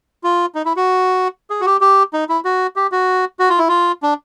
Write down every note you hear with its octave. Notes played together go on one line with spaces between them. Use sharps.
F4
D#4
E4
F#4
G#4
F#4
G4
G4
D#4
E4
F#4
G4
F#4
F#4
F4
E4
F4
D4